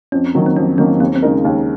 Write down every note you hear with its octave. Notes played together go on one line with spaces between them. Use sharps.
F2 C#4
D#3 F#3 A#3
C4
F2 C#4
D#3 F#3 A#3 C#4
D#2 C4
C4
C#3 G#3 D#4 A#4
D#2